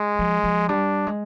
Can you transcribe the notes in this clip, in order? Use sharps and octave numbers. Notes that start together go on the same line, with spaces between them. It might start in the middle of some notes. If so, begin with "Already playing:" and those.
Already playing: G#3
F3
F3
G3 D4
G#3